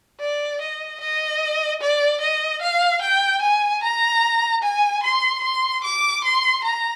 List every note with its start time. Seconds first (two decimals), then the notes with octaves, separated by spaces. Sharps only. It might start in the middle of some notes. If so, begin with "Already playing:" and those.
0.20 D5
0.61 D#5
1.01 D#5
1.81 D5
2.21 D#5
2.62 F5
3.02 G5
3.42 G#5
3.83 A#5
4.63 G#5
5.03 C6
5.43 C6
5.84 D6
6.24 C6
6.64 A#5